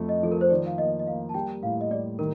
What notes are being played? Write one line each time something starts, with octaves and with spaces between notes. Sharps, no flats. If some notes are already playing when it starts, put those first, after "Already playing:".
Already playing: F2 A3
D#5
F3 A4
A#4
C5
D#3 D5
F5
A#3 D#5
D#5
A#3 F5
A5
G3 G5
A2 F5
D#5
G3 D5
D#3 A#4